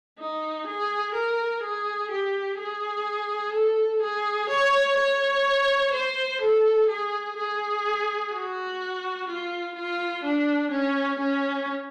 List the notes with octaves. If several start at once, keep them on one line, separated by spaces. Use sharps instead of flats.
D#4
G#4
A#4
G#4
G4
G#4
A4
G#4
C#5
C#5
C5
A4
G#4
G#4
F#4
F4
F4
D4
C#4
C#4